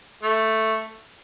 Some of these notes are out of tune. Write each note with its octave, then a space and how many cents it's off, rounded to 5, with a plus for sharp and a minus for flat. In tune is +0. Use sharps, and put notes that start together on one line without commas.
A3 +5